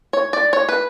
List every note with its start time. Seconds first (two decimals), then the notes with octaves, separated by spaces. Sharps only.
0.13 C#5
0.33 D5
0.53 C#5
0.69 B4